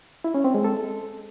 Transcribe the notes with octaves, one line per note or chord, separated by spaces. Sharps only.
E4
C#4
C4
G#3
A4